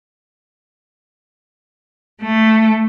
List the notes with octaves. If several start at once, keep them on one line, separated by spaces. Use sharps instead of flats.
A3